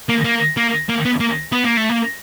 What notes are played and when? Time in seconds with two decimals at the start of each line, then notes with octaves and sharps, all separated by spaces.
0.09 A#3
0.24 A#3
0.57 A#3
0.89 A#3
1.05 B3
1.20 A#3
1.52 B3
1.64 A#3
1.77 A3
1.89 A#3